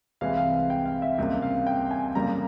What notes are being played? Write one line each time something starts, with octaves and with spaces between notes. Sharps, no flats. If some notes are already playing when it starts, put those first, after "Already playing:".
C2 C3 E3 G#3 F5
F5
G5
F5
E5
C#2 C3 G3 A#3
F5
G5
G#5
F2 C#3 G3 A#3 A#5